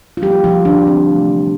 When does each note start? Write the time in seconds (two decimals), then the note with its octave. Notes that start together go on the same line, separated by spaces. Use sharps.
0.17 F4
0.22 D3 F3 G3 A#3 G4
0.44 F3 F4
0.65 D3 D4
0.87 C4
1.09 C3 E3 A3